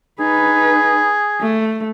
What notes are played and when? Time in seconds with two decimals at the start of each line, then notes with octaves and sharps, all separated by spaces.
0.20 D#4 G#4 B4
1.41 A3